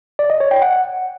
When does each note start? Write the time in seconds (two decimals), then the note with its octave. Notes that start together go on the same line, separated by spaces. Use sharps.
0.19 D5
0.30 D#5
0.40 C#5
0.51 G5
0.62 F#5